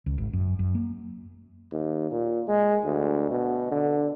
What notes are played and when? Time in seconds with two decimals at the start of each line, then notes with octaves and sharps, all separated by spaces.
0.06 C#2
0.18 G#1
0.33 F#2
0.59 F#2
0.75 A#3
1.72 D#2
2.11 A#2
2.48 G#3
2.85 D2
3.31 B2
3.71 D3